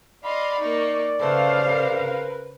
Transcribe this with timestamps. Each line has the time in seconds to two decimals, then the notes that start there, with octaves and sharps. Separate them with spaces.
0.24 D5 D#5 F5 B5 C6
0.61 A#3 D#4 C#6
1.20 C#3 A3 B4 C5 F5
1.65 A#4 B4